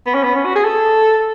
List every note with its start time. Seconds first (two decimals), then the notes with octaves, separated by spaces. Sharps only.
0.06 B3
0.14 C#4
0.23 B3
0.36 C#4
0.45 F#4
0.55 G#4
0.64 A4